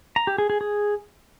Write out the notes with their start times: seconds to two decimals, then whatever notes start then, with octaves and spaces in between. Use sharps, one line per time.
0.16 A#5
0.27 G4
0.38 G#4
0.50 G#4
0.61 G#4